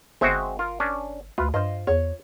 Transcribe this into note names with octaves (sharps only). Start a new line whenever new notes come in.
G1 G#3 C4 F#4 C5 E5
F4 A#4
C#4 D4
D2 F4 B4
G2 F4 C5 D#5
E2 C#5